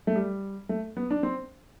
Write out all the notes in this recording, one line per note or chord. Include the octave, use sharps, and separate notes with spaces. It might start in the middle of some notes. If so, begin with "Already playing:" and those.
A3
G3
A3
B3
D4
C4